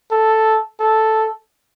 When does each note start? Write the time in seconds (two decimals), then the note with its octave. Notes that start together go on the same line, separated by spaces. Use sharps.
0.11 A4
0.80 A4